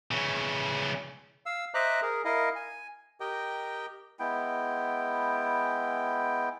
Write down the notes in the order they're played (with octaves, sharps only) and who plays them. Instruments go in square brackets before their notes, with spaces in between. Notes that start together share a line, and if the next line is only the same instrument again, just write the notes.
[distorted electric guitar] C#3 E3
[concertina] F5 E6
C5 D#5 E5 A#5 D6 F#6
G#4 A#4
E4 A#4 D#5 F5
G#5
G4 A#4 D#5 G5
[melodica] G#3 B3 E4 G5